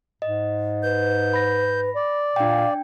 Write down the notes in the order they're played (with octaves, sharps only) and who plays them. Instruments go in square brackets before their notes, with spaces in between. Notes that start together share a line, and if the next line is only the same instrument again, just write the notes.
[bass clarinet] G#2 [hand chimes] D#5
[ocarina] B4 [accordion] G6
[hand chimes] B5 A#6
[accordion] D5
[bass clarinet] A#2 [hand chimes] D4 G5 [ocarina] F5